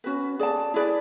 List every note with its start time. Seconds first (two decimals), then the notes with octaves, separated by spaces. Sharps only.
0.04 C#4 F#4 B4
0.40 G#4 D5 A5
0.74 E4 G#4 B4 D5